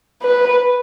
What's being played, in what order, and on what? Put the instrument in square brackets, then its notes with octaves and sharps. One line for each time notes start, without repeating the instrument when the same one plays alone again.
[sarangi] B4